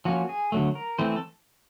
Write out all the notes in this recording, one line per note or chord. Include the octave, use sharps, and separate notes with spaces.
F3 A#3 C#4 F#4
G#4
D3 F#3 A3
A#4
E3 A3 C4 C5
A4